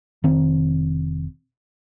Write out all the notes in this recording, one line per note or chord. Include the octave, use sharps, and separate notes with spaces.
F1 D#3 C4